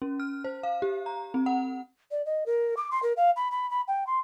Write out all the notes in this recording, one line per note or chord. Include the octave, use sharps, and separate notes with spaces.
C#4
F6
C5
F5
G4
A#5
C4
F#5
D5
D#5
A#4
D6
C6
A#4
F5
B5
B5
B5
G5
C6